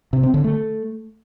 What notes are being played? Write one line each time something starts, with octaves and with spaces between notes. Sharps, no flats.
C3
C4
D3
A3